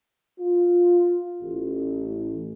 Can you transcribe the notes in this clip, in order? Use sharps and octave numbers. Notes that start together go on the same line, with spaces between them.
F4
A1